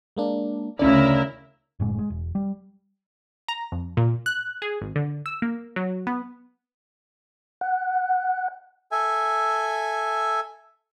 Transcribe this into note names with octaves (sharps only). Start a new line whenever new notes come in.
G#3 A#3 D4
D2 C#3 C#4 D4 E4 A#4 D5 E5
F#1 A2 G#3
G#3
E1
G3
A#5
F2
A#2
F#6
G#4
G#1
D3
E6
A#3
F#3
B3
F#5
A4 E5 G#5